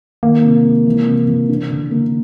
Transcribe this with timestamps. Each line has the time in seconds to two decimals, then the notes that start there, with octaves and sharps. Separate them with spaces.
0.23 D#3 A#3
0.44 C3
0.65 G#3
0.86 E3
1.07 C3
1.28 E3
1.49 D4
1.70 D3
1.91 A#3